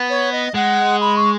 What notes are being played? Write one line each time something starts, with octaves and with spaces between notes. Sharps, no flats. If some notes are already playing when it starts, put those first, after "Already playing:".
Already playing: B3
C#5
D#5
G#3 F#5
B5
C#6